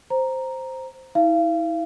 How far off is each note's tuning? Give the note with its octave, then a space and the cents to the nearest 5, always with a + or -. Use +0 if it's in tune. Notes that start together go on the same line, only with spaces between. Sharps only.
C5 +0 A#5 +0
E4 -35 F5 -35